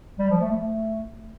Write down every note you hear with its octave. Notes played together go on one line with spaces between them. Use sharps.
G3
F3
A3
A3